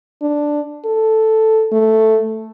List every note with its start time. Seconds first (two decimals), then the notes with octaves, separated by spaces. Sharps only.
0.22 D4
0.85 A4
1.72 A3